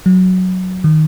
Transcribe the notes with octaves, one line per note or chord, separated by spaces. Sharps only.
F#3
D#3